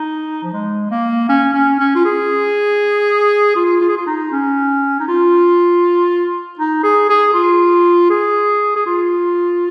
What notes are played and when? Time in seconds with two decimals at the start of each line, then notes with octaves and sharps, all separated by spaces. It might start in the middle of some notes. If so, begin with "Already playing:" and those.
Already playing: D#4
0.43 F3
0.53 G#3
0.91 A#3
1.29 C#4
1.54 C#4
1.80 C#4
1.95 F4
2.05 G#4
3.56 F4
3.81 F4
3.89 G#4
3.97 F4
4.07 D#4
4.32 C#4
5.00 D#4
5.08 F4
6.59 D#4
6.84 G#4
7.10 G#4
7.34 F4
8.10 G#4
8.76 G#4
8.86 F4